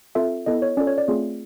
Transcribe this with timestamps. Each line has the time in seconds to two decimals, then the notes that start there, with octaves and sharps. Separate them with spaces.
0.15 C4 F4 A4 E5
0.46 B3 E4 A4 D#5
0.62 C#5
0.77 C#4 F4 A4 D5
0.87 C#5
0.98 D5
1.08 A3 C4 F4 G#4